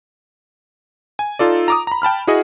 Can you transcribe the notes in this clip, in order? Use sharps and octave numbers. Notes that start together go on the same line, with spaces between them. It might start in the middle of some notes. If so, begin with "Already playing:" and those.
G#5
D#4 F4 A4 D5
A#5 D6 D#6
A#5 B5
G5 A5 B5 F6
E4 F#4 G#4 D#5 F#5 G#5